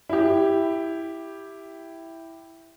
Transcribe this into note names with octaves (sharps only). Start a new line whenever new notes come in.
E4 G4